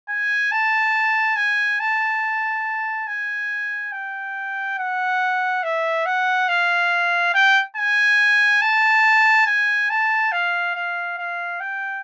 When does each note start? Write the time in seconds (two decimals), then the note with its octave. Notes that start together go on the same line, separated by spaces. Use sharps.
0.09 G#5
0.51 A5
1.36 G#5
1.80 A5
3.07 G#5
3.92 G5
4.78 F#5
5.63 E5
6.06 F#5
6.48 F5
7.34 G5
7.76 G#5
8.62 A5
9.46 G#5
9.90 A5
10.32 F5
10.75 F5
11.18 F5
11.60 G5